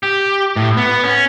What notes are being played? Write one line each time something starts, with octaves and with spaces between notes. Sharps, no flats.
G4
A2
B3
C#4